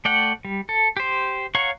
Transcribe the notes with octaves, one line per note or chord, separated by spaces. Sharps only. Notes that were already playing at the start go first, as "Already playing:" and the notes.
A3 D5 F#5 G5
G3
A4
G4 C5
C#5 F5 F#5 A#5 C#6